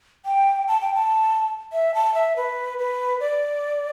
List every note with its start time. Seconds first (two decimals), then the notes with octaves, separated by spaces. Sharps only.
0.26 G5
0.68 A5
0.81 G5
0.94 A5
1.73 E5
1.95 A5
2.14 E5
2.36 B4
2.78 B4
3.20 D5